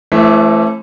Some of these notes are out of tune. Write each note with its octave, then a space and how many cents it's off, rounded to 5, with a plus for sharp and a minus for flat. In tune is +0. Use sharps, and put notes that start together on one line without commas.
E3 +25 A3 -15 C#4 -45